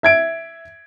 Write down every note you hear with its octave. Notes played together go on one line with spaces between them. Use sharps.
E5 G#6 D7